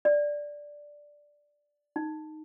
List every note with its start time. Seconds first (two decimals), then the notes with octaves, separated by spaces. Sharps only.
0.05 D5
1.96 D#4